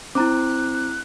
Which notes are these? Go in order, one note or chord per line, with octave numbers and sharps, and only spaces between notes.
C4 E4 A#5 D6 F#6